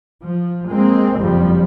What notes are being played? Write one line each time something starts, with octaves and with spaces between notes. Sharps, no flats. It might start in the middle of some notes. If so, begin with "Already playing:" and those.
F3
G#3 A#3 C4
F#1 F2 F3 G3